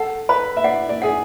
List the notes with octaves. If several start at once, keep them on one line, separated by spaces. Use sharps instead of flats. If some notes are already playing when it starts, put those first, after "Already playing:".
Already playing: A4 F#5
B4 B5
E5
D5 F#5
D5
G#4 F#5